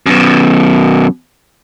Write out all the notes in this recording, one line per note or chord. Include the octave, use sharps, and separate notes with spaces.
F#2 B2